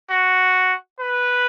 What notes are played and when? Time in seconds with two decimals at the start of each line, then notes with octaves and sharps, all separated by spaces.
0.10 F#4
1.00 B4